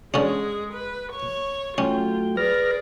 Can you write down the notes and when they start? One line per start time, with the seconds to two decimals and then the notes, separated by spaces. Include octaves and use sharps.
0.14 D3 G#3 C#4 G#4
0.73 B4
1.12 C#5 C#6
1.78 F#3 A3 C#4 F4 G5
2.37 G#4 B4 D5 F6 A#6